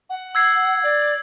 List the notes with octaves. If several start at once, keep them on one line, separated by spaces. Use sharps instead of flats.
F#5
E6 G#6 C7
D5